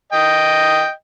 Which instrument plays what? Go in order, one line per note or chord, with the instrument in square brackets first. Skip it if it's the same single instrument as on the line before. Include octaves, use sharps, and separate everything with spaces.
[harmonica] D#5 G5